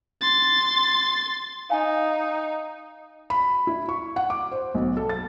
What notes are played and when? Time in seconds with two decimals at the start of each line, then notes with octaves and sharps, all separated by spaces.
0.21 C6 A6
1.70 D#4 F5 G#5
3.30 B5
3.67 E4
3.89 C#6
4.16 F#5
4.30 D6
4.51 C5
4.75 B1
4.97 A4
5.09 A6